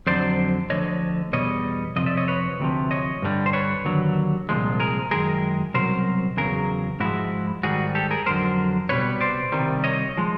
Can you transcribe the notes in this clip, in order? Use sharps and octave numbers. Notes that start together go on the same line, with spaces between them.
F2 D3 F#3 C5 D5
D2 D3 F3 C#5 D#5
E2 B2 G3 C#5 D#5
F2 C3 F3 D#5
D5 E5
C#5 D#5
B4 C#5
D2 C3 F3
C#5 D#5
G2 D3 G3
C5
B4 C#5
D#2 D3 F#3
C2 A#2 F3 G#3
G#4 A#4
F#2 D#3 G#3 G#4 A#4
C2 B2 F#3 A#4 C5
E2 C#3 F#3 G#4 A#4
G#2 F3 G#3 E4 F#4
G#2 D#3 G3 F#4 G#4
G4 A4
G#4 A#4
F2 D3 F#3 A#4 C5
C2 B2 G3 B4 C#5
C5 D5
C2 C3 D#3 G3
C#5 D#5
F3 G#3